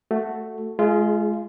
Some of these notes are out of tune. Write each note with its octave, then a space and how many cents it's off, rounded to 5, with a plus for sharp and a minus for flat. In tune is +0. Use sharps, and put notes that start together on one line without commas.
A3 +5 F#4 +0
G#3 +25 F4 -20 G#4 +0